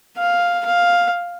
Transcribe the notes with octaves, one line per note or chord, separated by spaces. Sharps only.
F5
F5